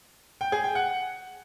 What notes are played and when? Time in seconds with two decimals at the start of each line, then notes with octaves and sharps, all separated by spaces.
0.41 G5
0.52 G#4
0.64 G5
0.75 F#5